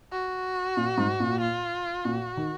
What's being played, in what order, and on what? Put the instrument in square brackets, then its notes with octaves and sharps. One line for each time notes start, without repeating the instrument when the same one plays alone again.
[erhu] F#4
[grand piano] A#2
G#2
A#2
[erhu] F4
[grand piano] A#2 [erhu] F#4
[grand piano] D#3